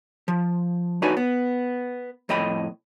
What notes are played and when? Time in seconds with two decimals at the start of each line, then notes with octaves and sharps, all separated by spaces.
0.28 F3
1.02 D4 D#4 F#4 B4 C#5 G#5
1.17 B3
2.29 F2 A2 D#5 G5 B5